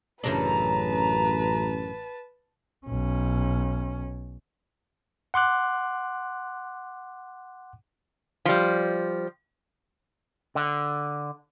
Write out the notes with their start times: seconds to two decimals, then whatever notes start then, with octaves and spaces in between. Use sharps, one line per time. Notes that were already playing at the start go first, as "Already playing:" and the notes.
0.24 A1 F#2 C#3 D4 B4 A5 A#5
2.87 B1 C#4
5.34 F#5 C6 D6 F#6
8.45 F3 G3
10.55 D3